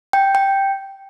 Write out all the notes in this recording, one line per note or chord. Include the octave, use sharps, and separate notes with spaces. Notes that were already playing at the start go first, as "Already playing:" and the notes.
G5
G5